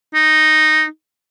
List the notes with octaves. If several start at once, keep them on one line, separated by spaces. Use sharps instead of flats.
D#4